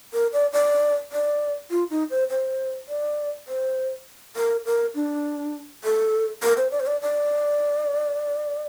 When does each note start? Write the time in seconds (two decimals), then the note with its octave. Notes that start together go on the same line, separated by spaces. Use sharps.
0.13 A#4
0.33 D5
0.53 D5
1.12 D5
1.70 F4
1.90 D#4
2.10 C5
2.29 C5
2.89 D5
3.48 C5
4.36 A#4
4.66 A#4
4.95 D4
5.84 A4
6.43 A#4
6.57 C5
6.71 D5
6.80 C5
6.87 D5
7.02 D5